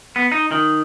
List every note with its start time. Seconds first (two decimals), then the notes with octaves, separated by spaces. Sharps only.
0.16 B3
0.32 D#4
0.51 D#3